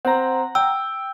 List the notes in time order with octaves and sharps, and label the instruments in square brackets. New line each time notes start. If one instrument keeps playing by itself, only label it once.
[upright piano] C4 [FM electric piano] F#5 A#5
[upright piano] G5 [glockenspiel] E6